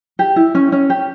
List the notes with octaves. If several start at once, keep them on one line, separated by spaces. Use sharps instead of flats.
G4
E4
C#4
C#4
G4